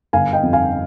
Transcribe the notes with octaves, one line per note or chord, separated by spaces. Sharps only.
G1 F5 G#5
D#5 G5
F2
F5 G#5